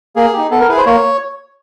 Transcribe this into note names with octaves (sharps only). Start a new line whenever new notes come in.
A#3 G#4
D#4 G4
B3 A4
A#4
E4 G#4 B4
C5
A#3 C#5